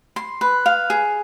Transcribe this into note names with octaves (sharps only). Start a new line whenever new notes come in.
C6
B4
F5
G#4